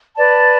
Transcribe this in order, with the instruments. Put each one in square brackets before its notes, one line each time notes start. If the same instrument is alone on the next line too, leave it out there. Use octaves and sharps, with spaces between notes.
[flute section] B4 D5 A5